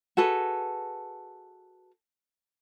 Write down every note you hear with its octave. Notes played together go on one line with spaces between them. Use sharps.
F#4 G#4 A4 B4